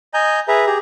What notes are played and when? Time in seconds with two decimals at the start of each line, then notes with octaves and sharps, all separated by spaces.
0.14 D#5 G#5 A#5 G6
0.48 G#4 B4 E5 A#5
0.67 G4 G#4 A#5